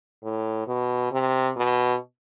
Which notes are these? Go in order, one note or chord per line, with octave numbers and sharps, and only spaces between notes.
A2
B2
C3
B2